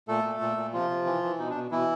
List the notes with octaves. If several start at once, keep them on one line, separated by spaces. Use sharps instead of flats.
A#2 A3 A4
A#2
A#2
A#2
C3 F3 F4
C3
E3
E3
B2 D#4
D4
B2
B2 E3 E4